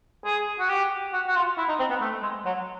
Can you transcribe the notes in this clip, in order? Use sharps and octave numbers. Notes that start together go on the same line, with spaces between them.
G#4
F#4
G4
F#4
F#4
F4
E4
D#4
C4
B3
A3
G#3
F#3